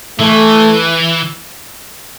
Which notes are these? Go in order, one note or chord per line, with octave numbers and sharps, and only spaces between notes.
E3 A3